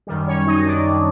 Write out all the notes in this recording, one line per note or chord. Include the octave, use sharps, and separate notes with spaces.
F#2 D#3 G3
C#4 C#5
D#4 D#5
D#5
D4 D5
D#3 G3